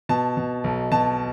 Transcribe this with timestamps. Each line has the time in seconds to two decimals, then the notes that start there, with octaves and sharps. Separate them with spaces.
0.09 B2 A5
0.37 B2
0.64 B1
0.91 B2 A5